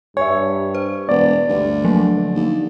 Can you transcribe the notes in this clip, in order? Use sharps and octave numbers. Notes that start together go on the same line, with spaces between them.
G2 C#5 E5 G#5
C5
E1 B3 D5
D2 G2
D3 F3 F#3 A#3
D#2